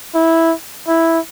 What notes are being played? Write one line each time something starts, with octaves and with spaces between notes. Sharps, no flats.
E4
E4